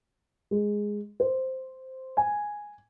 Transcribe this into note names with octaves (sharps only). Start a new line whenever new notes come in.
G#3
C5
G#5